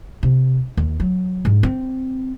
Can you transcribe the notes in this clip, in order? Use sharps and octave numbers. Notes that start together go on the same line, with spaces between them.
C3
D#2
F#3
G#2
C4